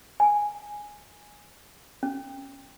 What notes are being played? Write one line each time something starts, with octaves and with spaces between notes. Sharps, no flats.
G#5
C#4